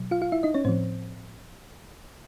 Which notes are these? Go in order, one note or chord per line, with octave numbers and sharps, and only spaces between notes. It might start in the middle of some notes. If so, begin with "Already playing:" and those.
Already playing: B2 F#3
F4 F5
F4 F5
E4 E5
D#4 D#5
C#4 C#5
A2 F3 C4 C5